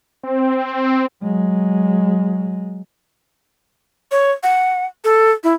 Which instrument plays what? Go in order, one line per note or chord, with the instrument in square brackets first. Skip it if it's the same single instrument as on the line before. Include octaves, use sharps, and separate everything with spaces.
[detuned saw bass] C4
[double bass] F#3 G#3
[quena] C#5
F#5
A4
E4